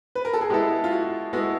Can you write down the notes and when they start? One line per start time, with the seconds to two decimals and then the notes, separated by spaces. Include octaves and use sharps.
0.15 B4
0.25 A#4
0.33 A4
0.41 G#4
0.50 G#3 B3 E4 G4 A4
0.84 F4
0.91 F#4
1.33 G#3 B3 E4 F#4 A4